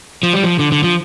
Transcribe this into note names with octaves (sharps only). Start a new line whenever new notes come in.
F3
G3
F3
D3
D3
F3